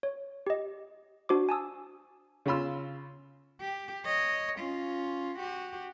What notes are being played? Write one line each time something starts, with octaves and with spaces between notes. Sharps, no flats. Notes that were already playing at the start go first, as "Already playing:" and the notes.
C#5
G4 D#5
D4 F#4 C5 D6
G#5 A5 D#6 E6
C#3 C#4 F4 B5 C6 E6
G4
C#5 D#5
C#4 F4
F#4 G4